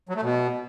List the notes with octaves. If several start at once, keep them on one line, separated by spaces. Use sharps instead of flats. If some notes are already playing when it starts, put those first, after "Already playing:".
F#3
A3
B2